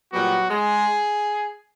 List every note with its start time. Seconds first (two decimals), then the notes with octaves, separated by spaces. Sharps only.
0.13 A#2 F#3 G3 B3 F#4
0.50 G#3 G#4